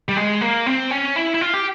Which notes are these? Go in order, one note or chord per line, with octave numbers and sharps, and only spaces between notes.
G3
G#3
A#3
C4
C#4
E4
E4
F4
G4